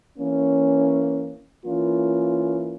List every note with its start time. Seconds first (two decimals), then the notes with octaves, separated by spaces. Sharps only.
0.18 E3 A#3 C#4
1.66 E3 A#3 C#4 F4